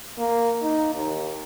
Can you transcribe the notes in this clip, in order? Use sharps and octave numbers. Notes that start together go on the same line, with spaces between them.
A#3
D#4
D#2